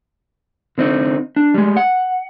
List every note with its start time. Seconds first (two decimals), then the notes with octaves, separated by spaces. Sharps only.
0.78 D3 C4 D#4
1.36 D4
1.54 G3 G#3
1.77 F#5